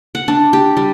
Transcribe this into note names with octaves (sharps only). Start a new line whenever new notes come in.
F#5
D4
G4
G3